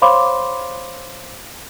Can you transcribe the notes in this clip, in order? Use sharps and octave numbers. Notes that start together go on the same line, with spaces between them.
C5 C#5 F5 B5 C6 D6